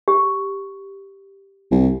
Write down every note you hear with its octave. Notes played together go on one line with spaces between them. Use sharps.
G4
C2